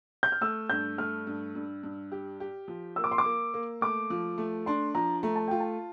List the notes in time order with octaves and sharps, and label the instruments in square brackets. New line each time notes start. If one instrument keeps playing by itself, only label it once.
[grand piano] G6
F6
[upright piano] A3 [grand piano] E6
[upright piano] G2 [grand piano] G6
[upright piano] A3 [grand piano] F6
[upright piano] G2
G2
G2
G4
G4
F3
[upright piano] A#3 [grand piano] E6
[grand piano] D6
C6
D6
[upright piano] A#3
A#3
[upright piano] A3 [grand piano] D6
[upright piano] F3
A3
[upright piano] D4 [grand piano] C6
[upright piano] F3 [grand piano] A#5
[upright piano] A3 [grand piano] A#5
[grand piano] A5
[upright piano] F4 [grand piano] G5
[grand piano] A5